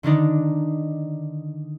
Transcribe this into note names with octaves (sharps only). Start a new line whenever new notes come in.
D3 D#3 D4 D#4